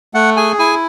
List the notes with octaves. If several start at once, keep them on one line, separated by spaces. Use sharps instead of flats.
A3 F#5
G#4 G#5
E4 G#5